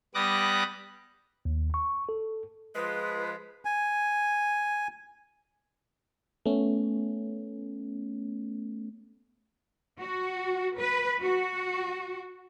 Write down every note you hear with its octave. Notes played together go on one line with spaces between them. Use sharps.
G3 B3 D6 D#6 F#6 A#6
D#2
C#6
A4
F3 G#3 B4
G#5
A3 B3 C#4
F#4
B4
F#4